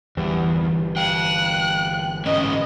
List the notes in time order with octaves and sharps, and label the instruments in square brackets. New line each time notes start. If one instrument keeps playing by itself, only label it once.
[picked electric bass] G1 E3 G3 [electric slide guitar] E2
[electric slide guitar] F5 G5 [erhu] F#6
[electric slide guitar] G#2 C#4 B4 [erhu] D#5